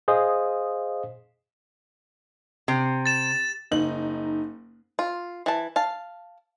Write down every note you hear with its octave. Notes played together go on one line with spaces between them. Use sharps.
G#4 C5 D#5 F5 D#6
C3
A6 E7
F#1 D#4 F#7
F4
E3 A5
F5 A5